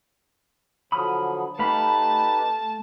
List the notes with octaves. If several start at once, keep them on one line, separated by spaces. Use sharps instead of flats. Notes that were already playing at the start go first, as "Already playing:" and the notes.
D3 F3 F#3 B5 D#6 F6
A3 D#4 G4 B4 F5 A5 B5